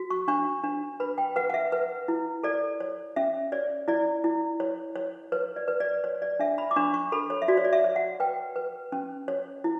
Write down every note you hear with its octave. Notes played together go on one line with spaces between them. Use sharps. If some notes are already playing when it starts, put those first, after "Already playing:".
Already playing: F#4
C#6
D4 C#6
D4
B4 B5
G5
B4 F#5
F#5
E5
B4
E4
A4 D5
C#5
C#4 E5
C#5 D5
E4 D5
E4
C#5
C#5
B4 C#5
D5
B4
D5
C#5
D5
D4 E5
B5
D6
D4 C#6
C#6
A4 B5
C#5
E5
F#4 D5
C#5
D5
E5
C#5
F#5
B4 G5
B4
C#4
C#5
E4